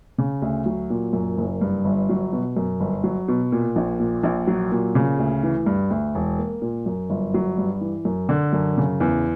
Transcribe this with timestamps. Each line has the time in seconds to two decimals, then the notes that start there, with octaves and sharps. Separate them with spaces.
0.18 C#3
0.42 D2
0.66 F#3
0.90 A#2
1.13 F#2
1.38 F#1
1.61 G2
1.85 G1
2.09 F#3
2.33 B2
2.57 F#2
2.80 G1
3.04 F#3
3.28 B2
3.52 A#2
3.76 A#1
4.00 A#2
4.24 A#1
4.47 F#3
4.72 A#2
4.95 C#3
5.18 D2
5.43 E3
5.66 G2
5.90 D2
6.15 E1
6.38 A#3
6.62 A#2
6.86 F#2
7.10 G1
7.34 F#3
7.58 G2
7.81 E3
8.05 F#2
8.29 D3
8.53 F#2
8.78 C#3
9.00 E2